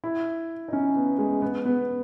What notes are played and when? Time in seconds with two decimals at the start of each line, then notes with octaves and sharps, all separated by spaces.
0.04 E4
0.68 D#4
0.73 C#4
0.96 B3
1.19 G#3
1.42 B3
1.65 B3